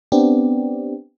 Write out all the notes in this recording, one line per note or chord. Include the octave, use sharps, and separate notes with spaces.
B3 C4 D4 G4